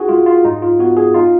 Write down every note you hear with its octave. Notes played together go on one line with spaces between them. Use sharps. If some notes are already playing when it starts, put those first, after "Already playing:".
Already playing: D#4 F#4 G#4
G#3 F4
F4
G#2 D#4
F4
B3 F#4
G#4
D#4 F4